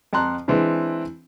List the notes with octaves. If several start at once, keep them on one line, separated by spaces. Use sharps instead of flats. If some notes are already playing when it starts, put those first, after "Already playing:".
F2 A5 A#5 C6 F#6
E3 G#3 C4 D4 E4